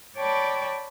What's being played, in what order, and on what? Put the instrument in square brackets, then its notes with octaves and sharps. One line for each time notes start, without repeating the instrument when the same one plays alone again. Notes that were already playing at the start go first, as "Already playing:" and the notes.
[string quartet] C#5 D5 G5 A5 B5 C#6